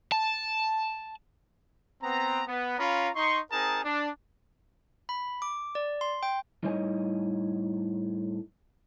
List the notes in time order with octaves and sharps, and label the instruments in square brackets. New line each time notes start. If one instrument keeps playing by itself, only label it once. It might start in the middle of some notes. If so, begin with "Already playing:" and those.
[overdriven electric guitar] A5
[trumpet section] B3 C4 A#5
B3
C#4 F4 F5 A#5 B5
D#4 C6 C#6
C4 D#4 G#4 A#4 A5 A#5
D4
[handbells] B5
D6
D5
C6
G5
[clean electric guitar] A2 G3 D#4 C#5 D#5 G#5